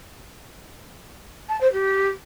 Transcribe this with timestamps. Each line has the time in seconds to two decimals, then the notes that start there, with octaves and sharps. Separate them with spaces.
1.49 A5
1.61 C5
1.73 G4